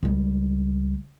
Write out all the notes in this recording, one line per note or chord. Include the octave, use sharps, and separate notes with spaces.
C#2 G3